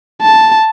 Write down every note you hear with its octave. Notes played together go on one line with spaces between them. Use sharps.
A5